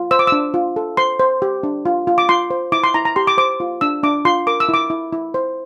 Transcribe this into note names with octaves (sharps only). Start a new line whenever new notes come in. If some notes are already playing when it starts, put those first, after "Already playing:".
Already playing: F4
C5 E6
D6
D4 E6
F4
A4
C5 C6
C5
G4
D4
F4
F4
D6
F4 C6
C5
E4 D6
C6
E4 A#5
A#5
G4 C6
D6
C5 D6
F4
D4 E6
D4 D6
F4 C6
A#4 D6
E6
E4 D6
E4
E4
C5